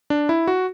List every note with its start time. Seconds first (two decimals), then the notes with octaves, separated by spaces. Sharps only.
0.10 D4
0.29 E4
0.48 F#4